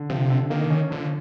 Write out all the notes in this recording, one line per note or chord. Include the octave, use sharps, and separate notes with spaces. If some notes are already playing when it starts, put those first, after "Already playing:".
Already playing: D3
C3 F3
D3
D#3 A#3
C#4
D3 F3